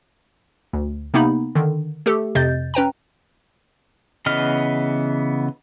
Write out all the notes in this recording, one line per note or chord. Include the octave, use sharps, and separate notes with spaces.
D2
C3 A#3 B3 D#4 B5
D3 D#3
A3 G4 A4
F2 C3 D#5 G6 A6
C#4 B4 G5 A#5
C#3 E3 B3 D#5 F6